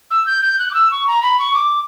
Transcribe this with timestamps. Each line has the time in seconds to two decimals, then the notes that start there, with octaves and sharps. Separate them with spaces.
0.11 E6
0.26 G6
0.42 G6
0.59 F#6
0.71 D6
0.74 E6
0.91 C#6
1.07 A#5
1.23 B5
1.39 C#6
1.54 D6